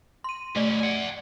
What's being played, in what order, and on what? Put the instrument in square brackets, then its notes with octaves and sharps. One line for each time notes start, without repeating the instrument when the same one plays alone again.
[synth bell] C6 D#7
[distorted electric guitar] B2 C#4 [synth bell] A3 D5
[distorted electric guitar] F#5 G#5